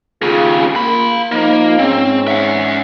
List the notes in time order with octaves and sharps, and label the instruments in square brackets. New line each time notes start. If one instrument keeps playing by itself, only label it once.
[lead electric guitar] D#2 C#3 [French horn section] F4 G#4
[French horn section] A#3 [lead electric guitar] F4 B5
[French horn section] F3 D#4 [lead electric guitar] A#3
[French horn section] G#2 C#4 [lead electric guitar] C4
[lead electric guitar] E5 F#5